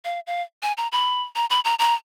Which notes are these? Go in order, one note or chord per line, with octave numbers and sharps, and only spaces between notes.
F5
F5
G#5
A#5
B5
A#5
B5
A#5
A#5